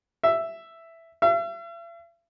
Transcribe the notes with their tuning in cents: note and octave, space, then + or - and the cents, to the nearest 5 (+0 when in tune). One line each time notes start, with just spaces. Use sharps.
E5 +5
E5 +45